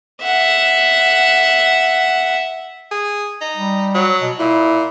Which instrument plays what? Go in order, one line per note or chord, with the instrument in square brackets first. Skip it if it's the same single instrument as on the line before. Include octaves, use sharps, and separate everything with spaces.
[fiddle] E5 F#5
[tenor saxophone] G#4
D#4
[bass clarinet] G3
[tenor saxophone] F#3
[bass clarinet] B2
[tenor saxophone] A#2 [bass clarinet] E4